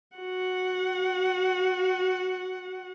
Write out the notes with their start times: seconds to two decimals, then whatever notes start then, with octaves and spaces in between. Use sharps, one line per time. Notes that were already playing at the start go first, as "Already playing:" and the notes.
0.17 F#4 F#5